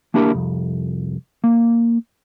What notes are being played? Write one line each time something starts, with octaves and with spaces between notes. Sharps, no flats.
A#3 D4 E4 G4 A#4
C2 F2
A#3